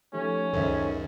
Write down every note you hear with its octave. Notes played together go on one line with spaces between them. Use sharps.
F3 A3 C#4 D#4 G4
C#2 F#2 D#3 A4 C5 E5